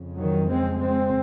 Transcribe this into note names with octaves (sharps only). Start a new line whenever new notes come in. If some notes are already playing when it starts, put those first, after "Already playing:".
Already playing: F2 C#3
D#3 F#3
G#3 C4
G#3 C4